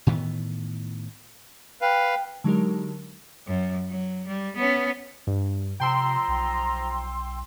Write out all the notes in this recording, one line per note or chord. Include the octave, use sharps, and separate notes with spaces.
A2 D#3 E3 B3
B4 F5 G5
D3 F#3 G#3 D#4 G4 A#4
F#2
F#3
G3
B3 C#4
G2
C3 F3 G5 A#5 C6 E6
B1